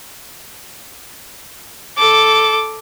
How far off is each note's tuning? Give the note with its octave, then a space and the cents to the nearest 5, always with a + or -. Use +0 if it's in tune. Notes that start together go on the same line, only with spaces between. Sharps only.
A4 +0 D6 +0